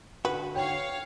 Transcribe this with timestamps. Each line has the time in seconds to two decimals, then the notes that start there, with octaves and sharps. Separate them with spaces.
0.25 D3 F#4 B4
0.55 C#5 F5 G5